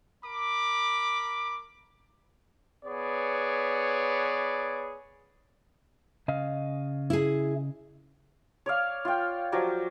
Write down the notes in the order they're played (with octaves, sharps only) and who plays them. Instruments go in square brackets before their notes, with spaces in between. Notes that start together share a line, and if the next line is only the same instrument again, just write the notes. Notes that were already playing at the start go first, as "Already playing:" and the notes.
[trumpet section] A#4 B5 D6
B3 G#4 B4 C#5 D5
[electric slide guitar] C#3 D#5 F5
[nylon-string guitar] E4 G#4
[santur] C#5 D5 F5
F4 G5
F3 F#3 G4 D5